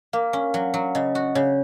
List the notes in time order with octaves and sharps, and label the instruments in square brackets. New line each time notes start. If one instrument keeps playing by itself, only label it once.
[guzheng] A#3 [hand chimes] F5
[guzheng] C#4
F#3
F#3
[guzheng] C#3 [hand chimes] D#5
[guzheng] F#4
[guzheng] C#3 [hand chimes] C#5